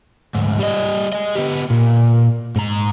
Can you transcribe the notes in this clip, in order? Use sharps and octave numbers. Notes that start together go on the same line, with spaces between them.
D2 G#2
G3 D#5
G#4 D#5
B3 G4
A#2
G#2 A#5